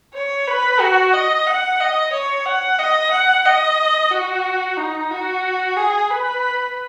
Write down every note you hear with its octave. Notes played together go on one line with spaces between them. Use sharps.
C#5
B4
F#4
D#5
F#5
D#5
C#5
F#5
D#5
F#5
D#5
F#4
D#4
F#4
G#4
B4